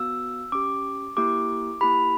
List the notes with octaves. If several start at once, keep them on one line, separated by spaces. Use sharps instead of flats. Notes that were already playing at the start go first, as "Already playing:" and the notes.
Already playing: B3 F#4 E6
C#4 G4 D6
A#3 E4 G4 D6
A#3 E4 G4 B5